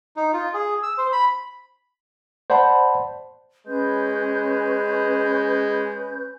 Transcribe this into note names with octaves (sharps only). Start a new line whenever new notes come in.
D#4
F4
G#4
E6
C5
B5
C5 D5 F#5 A5 B5
G#3 C#4 B4 G6